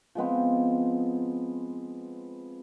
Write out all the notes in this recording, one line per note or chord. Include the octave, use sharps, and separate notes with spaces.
F3 G#3 B3 C4